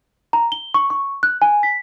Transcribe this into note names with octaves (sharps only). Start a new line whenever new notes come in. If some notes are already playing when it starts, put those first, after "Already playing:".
A#5
G7
C#6
C#6
F#6
G#5
B6